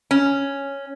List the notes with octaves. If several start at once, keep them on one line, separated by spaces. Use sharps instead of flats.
C#4